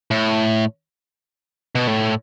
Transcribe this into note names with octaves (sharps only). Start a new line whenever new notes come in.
A2
B2
A2